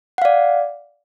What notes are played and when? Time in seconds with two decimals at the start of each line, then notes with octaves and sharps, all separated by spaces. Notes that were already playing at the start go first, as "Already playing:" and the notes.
0.18 F#5
0.22 F5
0.25 D5